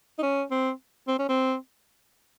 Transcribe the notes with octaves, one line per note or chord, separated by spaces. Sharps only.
D#4
C#4
C4
C4
C#4
C4